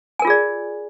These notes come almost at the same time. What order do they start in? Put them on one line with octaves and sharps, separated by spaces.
G#5 A#4 F4 G#4 D5